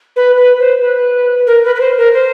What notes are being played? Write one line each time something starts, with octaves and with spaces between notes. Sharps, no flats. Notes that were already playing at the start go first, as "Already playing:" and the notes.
B4
B4
C5
B4
A#4
B4
B4
C5
A#4
C5